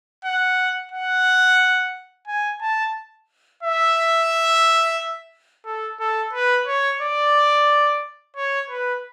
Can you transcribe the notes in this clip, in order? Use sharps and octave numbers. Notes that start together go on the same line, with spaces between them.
F#5
F#5
G#5
A5
E5
A4
A4
B4
C#5
D5
C#5
B4